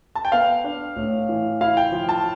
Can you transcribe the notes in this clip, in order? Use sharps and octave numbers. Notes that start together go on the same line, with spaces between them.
A5
G5
B3 F5
D4
A2
E3
E4 F5
G5
F3
A5